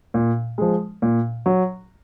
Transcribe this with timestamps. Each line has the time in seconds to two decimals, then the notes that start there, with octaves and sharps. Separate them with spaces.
0.14 A#2
0.58 F3 G#3
1.02 A#2
1.46 F#3